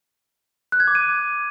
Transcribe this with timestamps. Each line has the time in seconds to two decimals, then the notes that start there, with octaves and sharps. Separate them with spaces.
0.72 F#6
0.80 G#6
0.88 D6
0.95 D#7